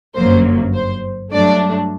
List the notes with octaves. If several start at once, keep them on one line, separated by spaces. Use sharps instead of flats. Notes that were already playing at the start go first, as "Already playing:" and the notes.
G1 F#2 F#3 A#3 C5
C5
G2 F#3 A3 D4 D5